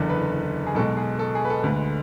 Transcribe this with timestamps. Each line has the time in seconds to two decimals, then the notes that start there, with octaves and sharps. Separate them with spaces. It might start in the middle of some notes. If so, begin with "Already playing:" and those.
Already playing: F#1 E2 D3
0.09 B4
0.67 G#4
0.75 B1 B2 G#3 A4
0.97 G#4
1.19 A4
1.35 G#4
1.45 B4
1.50 A4
1.64 D2 D3 G#3 B4